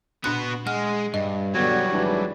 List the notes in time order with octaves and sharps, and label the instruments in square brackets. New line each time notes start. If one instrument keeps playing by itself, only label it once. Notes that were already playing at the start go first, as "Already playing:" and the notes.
[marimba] A#2 D4 F#6 [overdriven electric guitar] B3 F#4
[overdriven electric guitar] G#3 [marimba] F#5 F6
[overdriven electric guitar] G2 [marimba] D#5
[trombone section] B2 D3 B3 [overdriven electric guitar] F#3 G3 [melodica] F#4 C#5
[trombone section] G#1 E3 D4